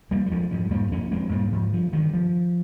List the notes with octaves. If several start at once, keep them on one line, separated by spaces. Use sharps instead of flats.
F2 G3 A#3
G3
F2 F3 G#3
G#2 F3 G#3
G#2 G3 A#3
F2 A#3 C#4
F2 G#3 C4
G#2 G3 A#3
G#2 F3
G2 F3
G2 D#3
F3